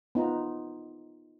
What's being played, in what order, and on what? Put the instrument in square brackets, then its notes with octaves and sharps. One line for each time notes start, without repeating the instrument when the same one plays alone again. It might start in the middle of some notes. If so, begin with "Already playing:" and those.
[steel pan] B3 D#4 F4 A#5